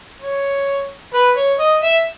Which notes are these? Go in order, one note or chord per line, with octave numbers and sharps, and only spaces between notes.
C#5
B4
C#5
D#5
E5